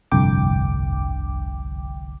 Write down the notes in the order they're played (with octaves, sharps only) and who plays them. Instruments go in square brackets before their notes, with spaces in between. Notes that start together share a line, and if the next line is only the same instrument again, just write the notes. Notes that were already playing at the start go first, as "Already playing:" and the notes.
[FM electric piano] G1 C2 F2 D3 G5 D6